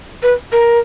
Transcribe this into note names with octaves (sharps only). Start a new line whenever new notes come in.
B4
A#4